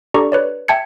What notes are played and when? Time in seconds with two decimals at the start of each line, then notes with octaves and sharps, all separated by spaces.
0.14 D4 G4 A4 D5 A#5 C#6
0.32 B4 C#5 D5
0.68 E5 G5 A5 G#6 C#7